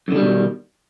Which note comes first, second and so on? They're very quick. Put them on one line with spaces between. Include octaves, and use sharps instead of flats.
F#2 D3 G3 B2 D#3